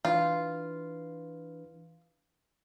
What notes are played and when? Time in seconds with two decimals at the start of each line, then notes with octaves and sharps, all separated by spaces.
0.05 E3 D4 F4 B4